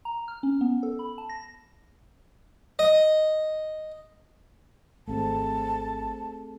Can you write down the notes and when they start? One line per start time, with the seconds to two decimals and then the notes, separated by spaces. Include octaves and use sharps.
0.05 A#5
0.28 F6
0.43 C#4
0.61 B3
0.83 A4
0.99 B5
1.18 A5
1.29 A#6
2.79 D#5
5.08 G#1 A3 C4 G#4 A5